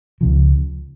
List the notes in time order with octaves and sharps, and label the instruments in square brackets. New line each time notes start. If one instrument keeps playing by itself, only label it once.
[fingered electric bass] C#2 C#3 F3